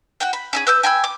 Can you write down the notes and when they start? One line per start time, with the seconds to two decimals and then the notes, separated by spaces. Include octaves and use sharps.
0.20 F#4 F#5 G5
0.33 B5
0.53 C#4 E4 G#4
0.67 B4 E6 G6
0.83 G5 G#5 B5 E6
1.04 D6